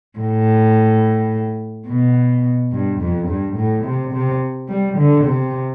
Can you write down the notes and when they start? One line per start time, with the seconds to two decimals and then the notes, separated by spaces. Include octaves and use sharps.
0.18 A2
1.87 B2
2.72 G2
3.00 F2
3.28 G2
3.56 A2
3.84 C3
4.13 C3
4.68 G3
4.98 D3
5.25 C3